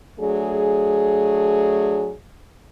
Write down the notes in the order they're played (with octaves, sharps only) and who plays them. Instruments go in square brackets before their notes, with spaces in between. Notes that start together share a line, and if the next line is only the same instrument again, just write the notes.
[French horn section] F#3 A3 D4 G#4